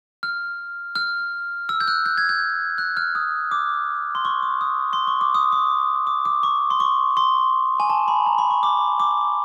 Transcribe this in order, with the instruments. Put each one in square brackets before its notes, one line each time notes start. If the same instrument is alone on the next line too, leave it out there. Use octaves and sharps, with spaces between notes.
[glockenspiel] F6
F6
E6
G6
F#6
G6
G#6
G6
F#6
F6
D#6
D6
C6
C#6
D6
D#6
C6
C#6
D6
D#6
D6
D6
D6
C#6
C6
C#6
C6
G#5
A5
B5
A#5
B5
C#6
D6
D6